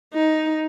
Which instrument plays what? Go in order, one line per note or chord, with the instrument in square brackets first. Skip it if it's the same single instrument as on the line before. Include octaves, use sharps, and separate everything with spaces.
[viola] D#4